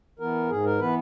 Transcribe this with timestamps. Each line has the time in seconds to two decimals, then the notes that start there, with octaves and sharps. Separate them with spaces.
0.19 E3 B3 A#4
0.49 G#2 G#4
0.65 A#4
0.79 E3 B3 B4